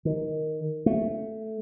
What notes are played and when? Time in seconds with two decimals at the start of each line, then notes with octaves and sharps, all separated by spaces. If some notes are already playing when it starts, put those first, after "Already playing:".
0.05 D#3
0.86 A3